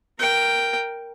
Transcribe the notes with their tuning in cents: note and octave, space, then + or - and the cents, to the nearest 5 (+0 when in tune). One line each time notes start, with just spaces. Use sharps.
A#4 +0 G5 +0